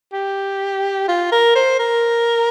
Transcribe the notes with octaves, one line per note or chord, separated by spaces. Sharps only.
G4
F4
A#4
C5
A#4